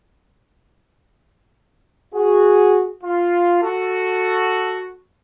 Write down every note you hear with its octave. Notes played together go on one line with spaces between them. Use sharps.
F#4 G#4
F4
F#4 A4